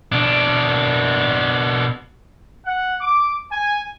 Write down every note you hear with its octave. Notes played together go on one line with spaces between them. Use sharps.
B2 D4
F#5
D6
G#5